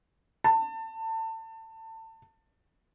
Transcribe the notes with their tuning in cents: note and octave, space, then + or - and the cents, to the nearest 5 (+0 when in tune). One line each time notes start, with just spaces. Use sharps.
A5 +25